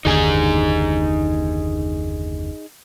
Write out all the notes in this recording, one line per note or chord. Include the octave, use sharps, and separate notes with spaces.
F#1 D#2 D3 D#4 G#4 G#5